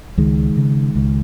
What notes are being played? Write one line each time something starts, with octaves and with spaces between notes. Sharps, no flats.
C#2 D#3 G#3
C#3
C#2